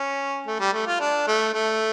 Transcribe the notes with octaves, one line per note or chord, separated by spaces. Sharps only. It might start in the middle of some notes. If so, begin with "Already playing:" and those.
Already playing: C#4
A3
G3
A3
F4
D4
A3
A3